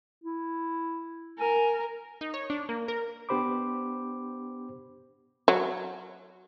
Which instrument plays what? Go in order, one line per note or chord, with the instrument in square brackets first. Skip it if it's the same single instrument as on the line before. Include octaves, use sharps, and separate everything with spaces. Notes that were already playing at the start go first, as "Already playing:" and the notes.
[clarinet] E4
[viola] A#4 [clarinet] G#5
[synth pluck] D#4
C#5
D4
A#3
A#4
[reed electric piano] B3 D4 G4 C5 B5 D6
[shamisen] F#3